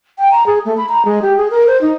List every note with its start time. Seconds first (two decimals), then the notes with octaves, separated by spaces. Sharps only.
0.18 G5
0.31 A#5
0.47 G#4
0.65 A3
0.77 B5
0.89 A#5
1.05 G#3
1.22 G4
1.37 G#4
1.51 A#4
1.67 C5
1.81 D#4